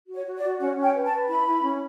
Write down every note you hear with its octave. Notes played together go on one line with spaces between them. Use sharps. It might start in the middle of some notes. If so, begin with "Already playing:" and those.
F#4
C#5
F#4
D5
F#4
C#4 F#5
C#4
G5
B4
A5
B4
E4 B5
E4
C#4